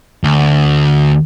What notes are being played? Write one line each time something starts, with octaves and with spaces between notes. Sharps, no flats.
D2